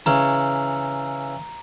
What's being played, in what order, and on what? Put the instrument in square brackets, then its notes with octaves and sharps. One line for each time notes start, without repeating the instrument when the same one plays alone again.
[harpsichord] C#3 E3 C#4 [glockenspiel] A#5